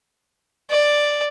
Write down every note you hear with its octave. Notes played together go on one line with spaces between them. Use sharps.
D5